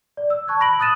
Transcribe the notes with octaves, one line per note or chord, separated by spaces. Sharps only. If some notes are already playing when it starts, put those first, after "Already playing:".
D5
E6
A5 C#6 F#6 G#6
B5 A#6 D7 F#7
D#6 F#6 A6 D#7 E7